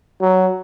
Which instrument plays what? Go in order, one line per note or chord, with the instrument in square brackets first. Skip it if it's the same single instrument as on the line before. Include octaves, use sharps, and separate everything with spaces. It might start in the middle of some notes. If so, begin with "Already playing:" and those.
[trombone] F#3